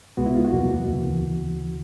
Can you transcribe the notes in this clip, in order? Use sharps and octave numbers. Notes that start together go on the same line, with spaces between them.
C#2 B2 G#3 B3 F#4
E4
F4
F#4
E2 B2 F#3 A#3
D2 C#3 E3